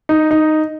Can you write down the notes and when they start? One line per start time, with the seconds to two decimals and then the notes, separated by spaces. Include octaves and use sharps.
0.09 D#4
0.31 D#4